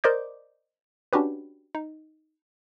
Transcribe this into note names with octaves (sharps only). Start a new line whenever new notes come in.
A#4 C5 D5 D#5 D6 G6
C#4 D4 F#4 G4 B4
D#4